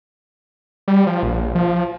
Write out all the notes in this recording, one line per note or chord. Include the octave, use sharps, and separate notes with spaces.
G3
F3
A#1
F3